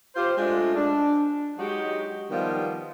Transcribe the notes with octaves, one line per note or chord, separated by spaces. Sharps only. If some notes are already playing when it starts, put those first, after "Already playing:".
F4 G4 C5
G#3 A3 D4 F4
D4
F#3 G#3 D#4 F#4 G4
D#3 F3 G3 B3